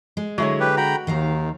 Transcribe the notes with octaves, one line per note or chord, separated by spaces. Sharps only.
G#3
D3 F#3 G#3 E4 G#4 C#5
G4 B4
F#4 G5 A#5 B5
D#2 D#3 F5 A#5